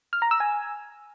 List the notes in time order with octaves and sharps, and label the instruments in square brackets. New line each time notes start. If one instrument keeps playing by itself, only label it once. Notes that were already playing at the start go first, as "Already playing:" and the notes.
[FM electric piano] F6
A#5
E6
G#5